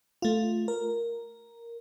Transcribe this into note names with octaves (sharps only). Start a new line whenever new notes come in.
A3 F4
A#4